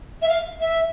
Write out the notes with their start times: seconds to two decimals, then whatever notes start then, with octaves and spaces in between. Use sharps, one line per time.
0.21 E5
0.28 F5
0.60 E5